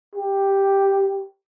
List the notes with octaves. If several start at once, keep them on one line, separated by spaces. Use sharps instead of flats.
G4